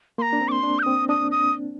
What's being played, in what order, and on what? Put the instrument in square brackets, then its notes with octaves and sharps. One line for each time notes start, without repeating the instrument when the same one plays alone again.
[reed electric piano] A#3 [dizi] C6
[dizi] A#5
[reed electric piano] D4
C4
[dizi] D6
C6
[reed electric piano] D4
[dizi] G6
[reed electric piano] C4 [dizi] D#6
[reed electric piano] D4 [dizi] D#6
[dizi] D#6